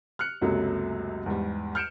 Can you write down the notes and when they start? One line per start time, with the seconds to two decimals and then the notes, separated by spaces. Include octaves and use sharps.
0.19 F6 F#6 C#7
0.41 C#2 F#2 C3 F#3 A3 A#3
1.26 E2 G#2 G3
1.75 F6 G6 C#7 D7 E7